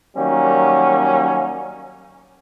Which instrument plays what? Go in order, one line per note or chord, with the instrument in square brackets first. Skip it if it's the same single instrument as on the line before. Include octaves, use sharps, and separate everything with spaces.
[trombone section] D#3 F#3 G3 A#3 C#4